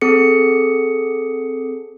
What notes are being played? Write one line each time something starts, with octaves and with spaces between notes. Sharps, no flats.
C4 G#4 A4 C#7